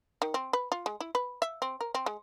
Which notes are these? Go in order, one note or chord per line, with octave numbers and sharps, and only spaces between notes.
D#3
C4
B4
F4
G#3
E4
B4
E5
C4
A#4
C4
G#3